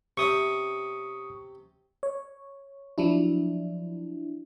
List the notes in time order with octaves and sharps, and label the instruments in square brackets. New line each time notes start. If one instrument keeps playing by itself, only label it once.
[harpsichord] C3 C4 C#4 [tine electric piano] C#6 D#6
[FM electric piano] C#5
F3 F#3 D4 E4